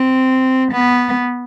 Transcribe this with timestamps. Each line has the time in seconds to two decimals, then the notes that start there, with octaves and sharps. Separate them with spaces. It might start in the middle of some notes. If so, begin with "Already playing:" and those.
Already playing: C4
0.72 B3